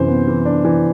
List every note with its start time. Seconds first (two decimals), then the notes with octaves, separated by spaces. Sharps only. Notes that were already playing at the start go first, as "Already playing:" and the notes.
Already playing: F#2 C3 E3 C5
0.08 B3
0.28 E3
0.45 D4
0.65 E3